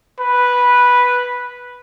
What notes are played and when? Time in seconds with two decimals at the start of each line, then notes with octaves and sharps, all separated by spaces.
0.20 B4